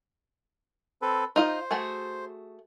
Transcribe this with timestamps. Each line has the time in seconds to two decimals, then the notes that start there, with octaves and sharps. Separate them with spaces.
1.02 C4 A4 B4
1.36 D#4 F4 C5 D#5
1.71 A3 F#4 G#4